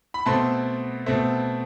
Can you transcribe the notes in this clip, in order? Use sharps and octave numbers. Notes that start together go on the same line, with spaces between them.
B5
B2 A3 C4 A5 C6
B2 A3 C4